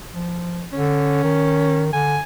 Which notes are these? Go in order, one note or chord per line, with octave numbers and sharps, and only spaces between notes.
F3
D3 C#4
D#3
D3 G#5